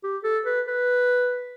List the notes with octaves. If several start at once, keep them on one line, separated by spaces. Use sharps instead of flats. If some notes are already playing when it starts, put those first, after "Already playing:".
G4
A4
B4
B4